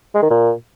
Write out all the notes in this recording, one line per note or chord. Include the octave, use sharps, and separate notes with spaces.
G#3
D#3
A#2